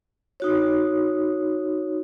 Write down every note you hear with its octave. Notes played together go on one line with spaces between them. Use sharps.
D#4 F#4 C#5